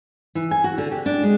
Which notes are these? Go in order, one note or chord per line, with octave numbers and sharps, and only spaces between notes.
E3
G#5
F#4
D3
G4
D4
G#3